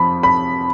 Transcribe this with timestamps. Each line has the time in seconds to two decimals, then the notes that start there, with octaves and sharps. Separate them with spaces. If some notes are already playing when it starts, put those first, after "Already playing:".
Already playing: F2 F3 B5
0.23 B5